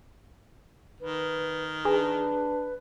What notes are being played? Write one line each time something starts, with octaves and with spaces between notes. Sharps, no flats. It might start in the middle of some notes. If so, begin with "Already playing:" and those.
D#3 B4
D4 G#4 B4